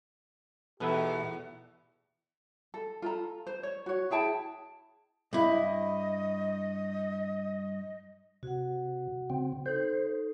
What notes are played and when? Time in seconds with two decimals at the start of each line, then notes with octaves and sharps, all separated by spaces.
0.80 E2 B2 D#4 G4 A4 B4 E5
2.74 A4
3.02 F4 A4 A#5
3.47 C5
3.63 C#5
3.86 F#4 C#5
4.11 E4 G#4 G5 A5
5.33 G2 E4 D#5
8.43 C3 F#4 F#5
9.30 C#3 C4
9.66 D#4 A4 C5